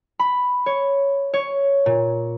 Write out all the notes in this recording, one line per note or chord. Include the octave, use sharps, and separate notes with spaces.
B5
C#5
C#5
A#2